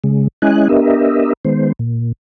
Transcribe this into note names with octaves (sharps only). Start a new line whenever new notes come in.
C#3 G#3
G#3 C#4 E4 D#5 G#5 F#6
B3 D4 G4 A#4 D#5 E5
D#3 G#3 B3 C5
A#2